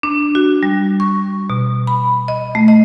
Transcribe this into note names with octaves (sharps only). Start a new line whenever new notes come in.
D4
F#4
G3
C#6
B2
B5
D#5
A3
D#5